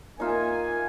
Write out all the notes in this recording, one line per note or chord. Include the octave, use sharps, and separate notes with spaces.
A#3 D#4 F4 E5 G#5